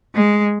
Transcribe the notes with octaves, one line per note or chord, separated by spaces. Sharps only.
G#3